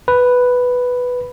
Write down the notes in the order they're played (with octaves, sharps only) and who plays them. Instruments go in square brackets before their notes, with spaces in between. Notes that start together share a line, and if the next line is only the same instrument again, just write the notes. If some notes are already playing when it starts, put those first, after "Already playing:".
[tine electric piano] B4